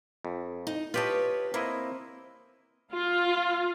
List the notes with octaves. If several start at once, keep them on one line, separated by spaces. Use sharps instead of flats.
F2
D#4
F4 G4 B4 C#5 D#5 A5
A#3 C4 E4 D#5
F4